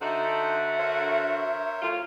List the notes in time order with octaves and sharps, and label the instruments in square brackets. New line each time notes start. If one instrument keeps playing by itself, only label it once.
[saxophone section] D3 F#4 F#5 [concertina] D#4 A4 C5 [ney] E5
[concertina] A#4 C5 C#5
[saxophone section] A2 F4